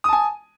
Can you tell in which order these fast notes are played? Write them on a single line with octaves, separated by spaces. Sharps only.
D#6 A5 G#5